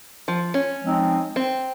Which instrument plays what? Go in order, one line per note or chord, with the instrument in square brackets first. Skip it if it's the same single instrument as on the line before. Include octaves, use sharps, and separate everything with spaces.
[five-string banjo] F3
C#4
[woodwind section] F3 G#3 C4 D#4
[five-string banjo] C4